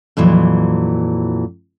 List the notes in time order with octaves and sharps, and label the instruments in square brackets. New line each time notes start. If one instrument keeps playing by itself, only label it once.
[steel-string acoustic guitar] F2 A#2 E3 F#3